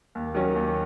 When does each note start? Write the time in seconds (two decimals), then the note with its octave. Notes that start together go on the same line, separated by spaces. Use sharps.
0.15 D#2
0.34 D#3 F#3 C#4
0.56 D#2